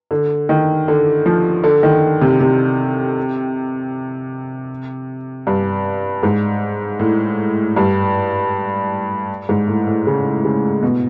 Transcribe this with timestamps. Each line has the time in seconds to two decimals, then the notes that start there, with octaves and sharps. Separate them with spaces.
0.11 D3
0.49 D#3
0.88 D3
1.26 F3
1.64 D3
1.83 D#3
2.21 C3
2.40 C3
5.47 G2
6.23 G#2
6.99 A2
7.76 G2
9.49 G#2
9.68 A2
9.87 A2
10.07 C#3
10.45 C#3
10.82 B2